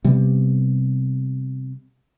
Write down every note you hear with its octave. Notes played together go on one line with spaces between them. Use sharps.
C3 G3 B3